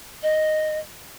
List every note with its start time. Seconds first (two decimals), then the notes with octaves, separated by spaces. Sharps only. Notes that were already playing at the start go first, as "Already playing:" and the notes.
0.23 D#5